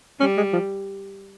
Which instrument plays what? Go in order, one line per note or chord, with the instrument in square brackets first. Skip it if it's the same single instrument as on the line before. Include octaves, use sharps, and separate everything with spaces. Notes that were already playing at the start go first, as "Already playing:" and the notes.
[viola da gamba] G3 [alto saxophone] C#4
[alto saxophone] G#3
F3